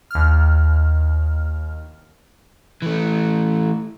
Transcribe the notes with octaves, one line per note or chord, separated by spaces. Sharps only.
D#2 F6
E3 A3